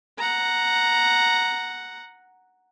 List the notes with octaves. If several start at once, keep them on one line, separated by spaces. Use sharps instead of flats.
F#5 A#5